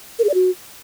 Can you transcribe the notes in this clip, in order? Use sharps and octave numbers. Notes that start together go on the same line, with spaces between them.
A#4
G#4
D5
F#4